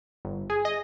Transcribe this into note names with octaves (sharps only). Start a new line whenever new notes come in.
G1
G#4
D#5